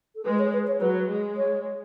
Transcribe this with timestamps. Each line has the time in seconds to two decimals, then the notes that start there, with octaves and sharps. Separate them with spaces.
0.16 A4
0.25 G#3 B4
0.39 C#5
0.53 B4
0.67 C#5
0.81 F#3 B4
1.09 G#3
1.37 C#5